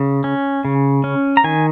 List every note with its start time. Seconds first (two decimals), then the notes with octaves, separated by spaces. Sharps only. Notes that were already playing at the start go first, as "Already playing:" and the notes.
Already playing: C#3
0.24 C#4
0.65 C#3
1.04 C#4
1.37 A#5
1.44 D#3 G#5